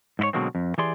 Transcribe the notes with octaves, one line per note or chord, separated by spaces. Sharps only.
G#2 E4 C#5
B2 D3 F#3 G#3 A#3 C4
F2
E3 G4 G#4 D5 C6